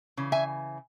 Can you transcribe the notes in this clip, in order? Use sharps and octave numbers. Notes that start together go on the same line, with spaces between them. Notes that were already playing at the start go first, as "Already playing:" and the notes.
C#3 E3
E5 G#5